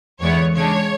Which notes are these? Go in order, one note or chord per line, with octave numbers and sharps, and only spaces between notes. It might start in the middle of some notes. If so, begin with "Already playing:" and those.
E2 D3 G#3 B3 E4 C#5
C#3 G#3 D4 C#5